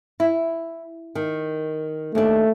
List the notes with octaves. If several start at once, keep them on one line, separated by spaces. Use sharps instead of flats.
E4
D#3
D#2 A3 D4